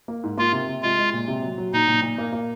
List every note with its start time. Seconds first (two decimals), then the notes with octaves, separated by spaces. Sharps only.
0.08 A#3
0.24 G#2
0.37 A#3 F4
0.53 C3
0.68 C3
0.82 G#3 F4
0.98 G#3
1.13 A#2
1.28 C3
1.43 F#3
1.58 F#3
1.73 A#2 D#4
1.88 A#2
2.02 A#2
2.18 A#3
2.32 A#3